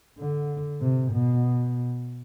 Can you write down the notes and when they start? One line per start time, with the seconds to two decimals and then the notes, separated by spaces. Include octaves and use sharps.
0.20 D3
0.81 C3
1.12 B2